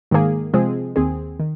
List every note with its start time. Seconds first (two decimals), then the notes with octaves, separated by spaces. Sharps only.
0.11 G#2 D#3 A#3 G#4
0.54 C3 F3 G#3 C4 G#4
0.96 D#2 D#3 C4 G#4
1.40 D#3